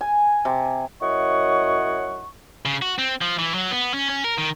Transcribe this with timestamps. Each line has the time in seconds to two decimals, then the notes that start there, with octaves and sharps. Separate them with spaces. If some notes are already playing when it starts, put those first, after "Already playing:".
0.01 G#5
0.45 C3
1.01 F#2 E4 C#5 D#5 F#5 C#6
2.65 C#3
2.82 F#4
2.99 C4
3.21 F3
3.39 E3
3.54 F#3
3.71 B3
3.94 C#4
4.09 C#4
4.24 A#4
4.38 D#3